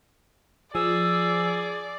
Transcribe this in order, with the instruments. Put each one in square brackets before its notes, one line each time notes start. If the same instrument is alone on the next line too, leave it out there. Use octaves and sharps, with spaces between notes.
[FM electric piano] F3 [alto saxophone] G#4 [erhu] D5 [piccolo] E6